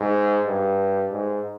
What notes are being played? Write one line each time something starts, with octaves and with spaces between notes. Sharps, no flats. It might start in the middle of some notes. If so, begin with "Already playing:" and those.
Already playing: G#2
G2
G#2